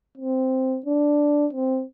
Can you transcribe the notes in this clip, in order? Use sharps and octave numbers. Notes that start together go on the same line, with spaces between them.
C4
D4
C4